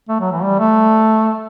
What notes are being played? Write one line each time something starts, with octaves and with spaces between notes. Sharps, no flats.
A3
F#3
E3
G3
A3